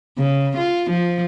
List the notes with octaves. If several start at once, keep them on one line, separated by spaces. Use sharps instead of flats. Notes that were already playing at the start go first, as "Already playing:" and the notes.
C#3
F4
F3